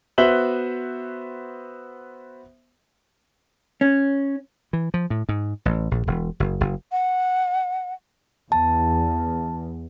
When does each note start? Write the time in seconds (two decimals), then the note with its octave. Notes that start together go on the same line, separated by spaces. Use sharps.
0.18 B3 F#4 C5 E5 F#7 G7
3.81 C#4
4.73 E3
4.94 F3
5.10 A2
5.29 G#2
5.65 A1
5.91 A#1
6.07 E1
6.40 F#1
6.61 F#1
6.92 F#5
8.52 E2 A5